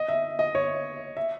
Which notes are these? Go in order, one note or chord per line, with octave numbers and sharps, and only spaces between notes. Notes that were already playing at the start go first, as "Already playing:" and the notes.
Already playing: D#5
E5
D#5
C#5
E5